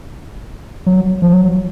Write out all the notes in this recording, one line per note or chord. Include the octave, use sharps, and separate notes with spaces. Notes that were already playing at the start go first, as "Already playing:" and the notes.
F#3
F3
F#3